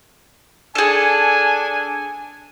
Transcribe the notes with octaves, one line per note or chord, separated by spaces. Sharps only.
D4 G#4 A4 G#5